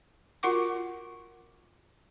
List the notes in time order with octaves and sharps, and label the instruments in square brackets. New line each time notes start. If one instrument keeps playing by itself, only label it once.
[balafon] F4 F#4 A#4 F#5 C#6 D6